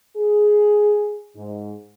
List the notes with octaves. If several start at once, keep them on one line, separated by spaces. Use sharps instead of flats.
G#4
G#2